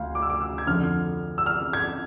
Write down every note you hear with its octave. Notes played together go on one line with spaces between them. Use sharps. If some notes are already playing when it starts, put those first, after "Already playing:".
Already playing: D2 F5
D6
E6
D6
E6
G#6
F2 D3 F3 F6
E6
F6
G#6